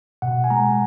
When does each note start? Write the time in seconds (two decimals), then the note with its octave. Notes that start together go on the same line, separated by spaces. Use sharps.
0.22 B2 F#5
0.44 G#5
0.50 G#3 A#5